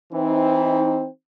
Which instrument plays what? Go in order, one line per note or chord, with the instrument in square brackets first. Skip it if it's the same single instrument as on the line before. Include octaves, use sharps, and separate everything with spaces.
[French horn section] E3 C4 D#4